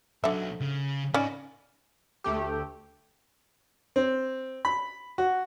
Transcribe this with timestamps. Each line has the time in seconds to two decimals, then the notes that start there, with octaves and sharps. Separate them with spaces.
0.24 B1 D3 F#3 E5
0.61 C#3
1.14 C#4 D#4 D5 D#5 B5
2.24 D2 A3 G4
3.96 C4
4.65 B5
5.18 F#4